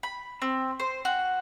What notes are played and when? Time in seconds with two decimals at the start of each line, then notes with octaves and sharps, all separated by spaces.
0.03 B5
0.42 C4
0.80 C5
1.05 F#4